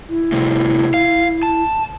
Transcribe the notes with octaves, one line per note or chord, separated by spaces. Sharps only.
E4
A2 C3
F5
A5